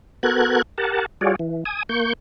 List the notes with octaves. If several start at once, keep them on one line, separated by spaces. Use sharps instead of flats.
B3 F#4 A4 A#4 F#6 G#6
G4 A#4 F#5 A5
G3 F4 F#4 G#4 C#5 D5
E3
G#5 D#6
A#3 C#6 G6